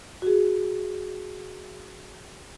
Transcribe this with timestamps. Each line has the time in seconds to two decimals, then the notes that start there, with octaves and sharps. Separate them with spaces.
0.22 F#4 G#4